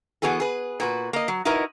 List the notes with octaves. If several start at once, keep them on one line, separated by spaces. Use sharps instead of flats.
E3 B3 F#4 G#4 A4
G#4 B4
A#2 F#4 B4
A#3 D#5
F#3
D#4 E4 F#4 A#4 B4 D#5